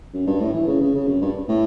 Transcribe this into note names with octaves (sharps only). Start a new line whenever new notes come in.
F#2
G2
A2
E3
C#3
C#3
C#3
F#2
G2
A2